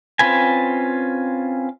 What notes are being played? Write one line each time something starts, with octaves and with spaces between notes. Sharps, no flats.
C4 C#4 F4 B4 G#5